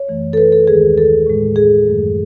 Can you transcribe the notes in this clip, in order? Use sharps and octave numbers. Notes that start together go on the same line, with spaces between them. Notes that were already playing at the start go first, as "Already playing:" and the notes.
Already playing: C#5
F#2 E3 A3
A4
B4
A4
D#2 D#3 G#3 G#4
A4
A2 G#3
G#4
F#2 D#3 F#3 A3